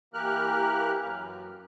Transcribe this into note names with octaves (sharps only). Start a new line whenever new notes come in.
E3 A#3 G4 A#4 F6 F#6
F#2